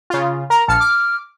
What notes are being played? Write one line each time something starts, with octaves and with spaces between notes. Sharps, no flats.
C#3 F4
A#4 A#5
A#1 A5 F6 C#7
D6